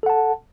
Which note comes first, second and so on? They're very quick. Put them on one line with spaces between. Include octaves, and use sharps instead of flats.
A4 F#5 A5